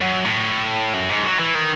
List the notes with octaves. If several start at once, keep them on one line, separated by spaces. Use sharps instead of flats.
F#2
A2
F#2
G#2
F#3
E3
D#3